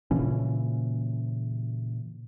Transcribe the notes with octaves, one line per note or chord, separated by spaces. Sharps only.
A#2 C#3 E3 C#4